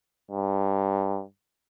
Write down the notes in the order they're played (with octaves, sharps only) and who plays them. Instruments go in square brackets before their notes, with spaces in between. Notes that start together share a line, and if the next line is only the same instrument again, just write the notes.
[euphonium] G2